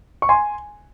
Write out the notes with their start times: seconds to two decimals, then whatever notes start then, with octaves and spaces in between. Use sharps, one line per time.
0.22 C#6
0.29 G#5 C6